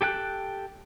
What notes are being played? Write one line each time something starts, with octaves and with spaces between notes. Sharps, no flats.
G4 A4 G5 F#6